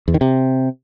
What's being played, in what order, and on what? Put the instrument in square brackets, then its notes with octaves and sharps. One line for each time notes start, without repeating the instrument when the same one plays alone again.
[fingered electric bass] E2
D#3
C3